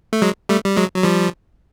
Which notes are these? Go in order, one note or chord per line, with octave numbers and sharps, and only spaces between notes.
A3
F#3 G#3
G3 A3
G3
F#3 G#3
F#3
F3 G3